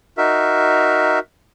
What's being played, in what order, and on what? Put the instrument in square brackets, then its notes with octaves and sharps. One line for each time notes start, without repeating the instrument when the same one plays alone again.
[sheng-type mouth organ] D#4 F#4 A#4 E5